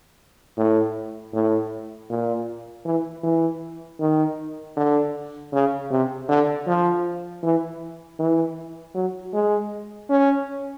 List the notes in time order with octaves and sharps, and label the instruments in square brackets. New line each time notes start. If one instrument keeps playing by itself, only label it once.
[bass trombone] A2
A2
A#2
E3
E3
D#3
D3
C#3
C3
D3
F3
E3
E3
F#3
G#3
C#4